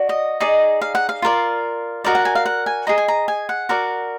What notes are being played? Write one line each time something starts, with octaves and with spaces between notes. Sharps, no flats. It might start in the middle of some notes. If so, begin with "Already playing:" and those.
Already playing: F#4 D5
D#5
D#4 G#4 D5
F5
F#5
F5
F4 A#4 D5
F#4 A#4 D5 D#5
F#5
G#5
F5
F#5
G#5
G#4 D#5 A#5
G#5
A#5
G#5
F#5
F#4 A#4 D5